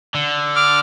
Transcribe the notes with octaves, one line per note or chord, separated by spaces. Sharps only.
D3
D6 F6